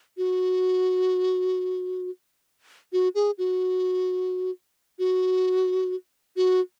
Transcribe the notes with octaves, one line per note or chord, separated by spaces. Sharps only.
F#4
F#4
G#4
F#4
F#4
F#4